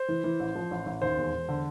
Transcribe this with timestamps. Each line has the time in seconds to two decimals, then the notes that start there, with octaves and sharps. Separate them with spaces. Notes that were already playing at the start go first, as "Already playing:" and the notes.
Already playing: C5
0.08 E3
0.24 E3
0.40 A1
0.55 F3
0.71 A1
0.86 A1
1.02 D#2 C5
1.18 E1
1.34 E1
1.49 D3